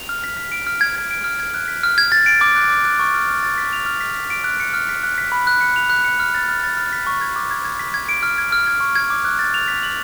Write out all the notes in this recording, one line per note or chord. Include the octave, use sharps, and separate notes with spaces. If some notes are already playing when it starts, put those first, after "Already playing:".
Already playing: F7
F6
B6
B6
D7
F6
G#6
G#6
D7
F6
G#6
F#6
B6
F6
G#6
A6
D7
D6
F#6
D6
F#6
C#6
F6
F6
A6
B6
F7
F6
B6
B6
D7
F#6
C#7
F6
B6
F#6
B6
B5
F#6
C#7
F7
F#6
C#7
F6
A6
F6
A6
F6
B6
C#6
G#6
D6
G#6
G#6
B6
G#6
D7
F6
G#6
F6
G#6
C#6
G#6
D6
F#6
A6
F7
B6
F#7